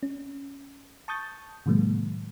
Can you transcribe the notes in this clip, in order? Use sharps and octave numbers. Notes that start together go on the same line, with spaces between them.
C#4
A5 C#6 D#6 G6 A6
A2 C3 D#3 F#3 G#3 A#3